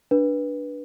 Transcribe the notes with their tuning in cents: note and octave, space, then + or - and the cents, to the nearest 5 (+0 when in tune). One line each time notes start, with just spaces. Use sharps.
D4 +0 B4 -15